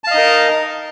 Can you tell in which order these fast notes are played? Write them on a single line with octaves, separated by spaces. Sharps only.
A5 F5 D#5 D#4 A#4